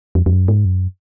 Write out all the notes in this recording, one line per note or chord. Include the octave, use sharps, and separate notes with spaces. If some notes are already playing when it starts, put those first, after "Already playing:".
F2
F2
F#2
G#2
F#2